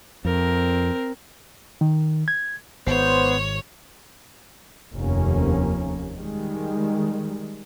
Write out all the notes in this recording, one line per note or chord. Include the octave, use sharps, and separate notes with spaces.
F2 C4 A#4
D#3
G#6
G#1 B3 C5 C#5
F1 D#2 F3 A#3 C#4
D#3 G3 G#3